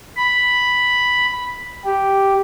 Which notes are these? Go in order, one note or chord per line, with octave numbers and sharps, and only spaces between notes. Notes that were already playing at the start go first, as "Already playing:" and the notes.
B5
G4